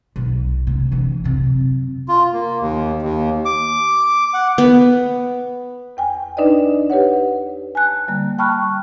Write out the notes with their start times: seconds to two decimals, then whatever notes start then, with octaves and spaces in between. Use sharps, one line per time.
0.16 B1
0.67 C3
0.92 D3 E3
1.24 F#2 C3
2.08 F4
2.33 A#3
2.61 D#2
3.02 D#2
3.45 D6
4.34 F#5
4.58 B3
5.97 E2 G5 G#5
6.37 D4 D#4 B4 D5 D#5
6.90 G4 B4 C#5 F#5
7.75 G#5 A5 F#6
8.08 D3 G3 A#3
8.39 G5 A5 B5 C#6 F6 F#6